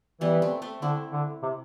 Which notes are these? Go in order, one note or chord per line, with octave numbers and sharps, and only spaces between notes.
E3 G3 B3
A3 C4
A3 C4
D3 C4 E4
D3
C3